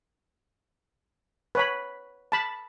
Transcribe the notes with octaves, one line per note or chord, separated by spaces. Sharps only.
B4 C#5 B5
A5 B5